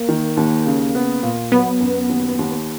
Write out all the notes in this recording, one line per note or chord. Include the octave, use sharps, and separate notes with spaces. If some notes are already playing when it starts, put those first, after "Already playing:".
Already playing: A#3
D#3
D#2
C#3
B3
A#2
F#3 B3
F#2
D#2
D#2